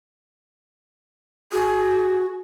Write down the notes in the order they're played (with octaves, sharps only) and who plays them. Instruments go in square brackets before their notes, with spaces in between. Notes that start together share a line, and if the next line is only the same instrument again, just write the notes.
[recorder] F#4 [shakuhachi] G#4